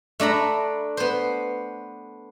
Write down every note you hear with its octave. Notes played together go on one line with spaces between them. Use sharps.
A3 D4 A#5 B5
B3 C5